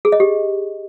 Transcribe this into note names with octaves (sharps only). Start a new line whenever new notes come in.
G#4
D#5
G4